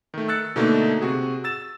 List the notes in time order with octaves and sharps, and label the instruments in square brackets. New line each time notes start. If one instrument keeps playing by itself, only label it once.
[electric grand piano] D#3 A3
E6 F#6 A6 C#7
B2 D3 A3 A#3 D#4
C3 F#4 G#4
E6 A6 E7